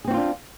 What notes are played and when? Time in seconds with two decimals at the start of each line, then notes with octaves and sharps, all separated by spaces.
0.05 G#4
0.08 C4
0.11 F#4
0.14 F4
0.17 D4